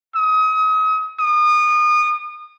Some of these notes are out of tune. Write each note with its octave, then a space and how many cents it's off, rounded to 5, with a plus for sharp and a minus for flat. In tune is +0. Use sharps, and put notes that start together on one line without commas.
D#6 +35
D#6 -30